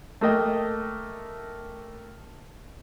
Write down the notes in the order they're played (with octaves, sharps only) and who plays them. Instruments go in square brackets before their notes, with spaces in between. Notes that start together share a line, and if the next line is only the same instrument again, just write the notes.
[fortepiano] A3 A#3 D#5 G5